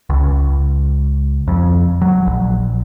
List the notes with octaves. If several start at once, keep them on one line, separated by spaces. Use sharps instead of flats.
C#2
F2
F#3
A#1